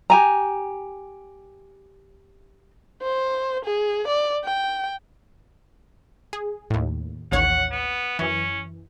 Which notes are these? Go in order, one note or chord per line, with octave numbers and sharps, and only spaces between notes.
G4 G#5 A#5
C5
G#4
D5
G5
G#4
D#2 A2
A1 D#2 C#5 F#5
B3
F#2 E3 C#4